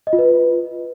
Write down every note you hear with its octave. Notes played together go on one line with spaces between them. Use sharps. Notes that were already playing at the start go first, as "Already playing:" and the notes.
D#5
F4
B4